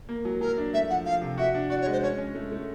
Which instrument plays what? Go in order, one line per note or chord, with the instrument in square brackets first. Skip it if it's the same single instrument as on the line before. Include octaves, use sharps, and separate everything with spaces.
[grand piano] A#3
F#3
[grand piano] F#3 [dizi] A#4
[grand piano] D4
[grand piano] A3 [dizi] E5
[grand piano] F3 [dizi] F#5
[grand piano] F3 [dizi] F5
[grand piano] C3
[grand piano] F#4 [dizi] E5
[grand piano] D4
[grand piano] F#4 [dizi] D5
[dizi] C#5
[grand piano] G#3
[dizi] C5
[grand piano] C#4 [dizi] C#5
[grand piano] C#4
A3
A3